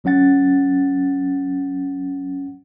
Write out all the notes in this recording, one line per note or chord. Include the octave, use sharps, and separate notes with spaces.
G1 F#3 C#4 F#5 A6